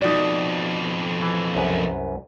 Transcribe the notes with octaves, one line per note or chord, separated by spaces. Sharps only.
F2 B2 D#4 F#4 D5
E3
C2 F#2 B4